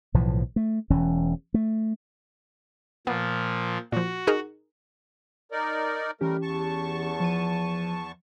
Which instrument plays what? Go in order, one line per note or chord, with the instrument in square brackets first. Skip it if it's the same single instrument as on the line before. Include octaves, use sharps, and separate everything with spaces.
[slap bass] B1 A2 E3 F3
A3
E1 E3 C#4
A3
[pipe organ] A#2 F3 [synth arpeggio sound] B3
[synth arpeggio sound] A#2 F3 [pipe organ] F#4
[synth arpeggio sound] D#4 G#4 A#4
[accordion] D#4 A#4 D5
[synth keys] E3 C#4 G4 [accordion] G3 A3 A#4
[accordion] E2 A5 C#6
[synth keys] F3 D#7